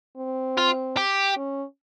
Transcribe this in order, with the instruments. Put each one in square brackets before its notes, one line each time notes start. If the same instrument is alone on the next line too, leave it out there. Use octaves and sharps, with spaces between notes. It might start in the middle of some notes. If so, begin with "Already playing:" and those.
[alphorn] C4
[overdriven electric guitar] F4
G4
[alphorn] C#4